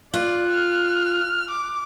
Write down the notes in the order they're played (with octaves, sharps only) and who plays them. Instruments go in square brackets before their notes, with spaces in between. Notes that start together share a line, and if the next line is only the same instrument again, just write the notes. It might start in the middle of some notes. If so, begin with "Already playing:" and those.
[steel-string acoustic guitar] F4 [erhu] D5 [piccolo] F#6
[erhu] F6
D6